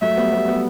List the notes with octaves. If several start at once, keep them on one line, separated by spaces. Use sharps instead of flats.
F#3 A3 E5
G3 B3
G3 B3
G3 B3